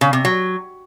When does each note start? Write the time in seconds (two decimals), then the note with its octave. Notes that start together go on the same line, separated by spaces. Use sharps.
0.01 C#3
0.13 C3
0.25 F#3